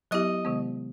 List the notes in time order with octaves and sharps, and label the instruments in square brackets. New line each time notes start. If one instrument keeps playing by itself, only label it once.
[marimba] F#3 B3 E4 G4 [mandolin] D#5
[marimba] C3 D#3 G#3 B3